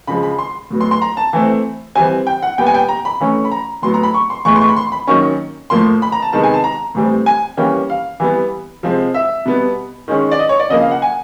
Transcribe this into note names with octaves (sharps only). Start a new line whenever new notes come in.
C#3 F3 G#3 B5
B5
C6
A2 F#3 B3
C6
C6
A#5
A5
E3 A3 C4
E3 G3 C4 G#5
G5
F#5
A#2 G3 B3 G5
G#5
G5
A#5
B5
E3 A3 C#4
B5
A#5
A2 F#3 B3 C6
A#5
B5
C#6
C6
A2 E3 G#3 B3 C#6
C6
C#6
B5
C6
B5
D#3 F#3 A#3 C#4 C#6
A2 F3 A#3 C6
B5
A#5
A5
C3 D#3 G#3 B3 A5
G#5
A5
A#5
A2 E3 G3 C4
G#5
E3 G3 A#3 C#4 G5
F5
E3 G3 B3
C3 F3 G#3 C4
E5
B2 G3 B3
D#3 G#3 C#4
D5
D#5
C#5
D5
C#3 F3 A#3 D#5
F5
F#5
G#5